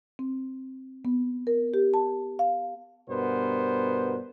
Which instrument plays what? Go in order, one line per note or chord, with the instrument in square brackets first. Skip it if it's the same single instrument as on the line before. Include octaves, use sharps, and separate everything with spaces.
[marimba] C4
B3
A#4
G4
A5
F5
[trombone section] G2 B2 B3 A#4 C5